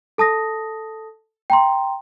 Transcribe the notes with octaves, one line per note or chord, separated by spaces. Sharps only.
A4 A5 D#6 A#6
G5 A#5 C6